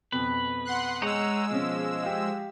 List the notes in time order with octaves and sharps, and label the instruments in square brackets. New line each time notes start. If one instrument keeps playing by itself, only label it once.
[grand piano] F2 B2 [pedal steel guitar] B4
[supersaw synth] F#5 C6 F#6
[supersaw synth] G#3 E6 [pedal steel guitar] D#4 C#5 F#5
[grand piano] B2 C#4 [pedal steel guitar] F3
[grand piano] G4 F5